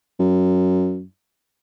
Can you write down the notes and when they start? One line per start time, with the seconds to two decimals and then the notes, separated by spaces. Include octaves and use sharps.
0.20 F#2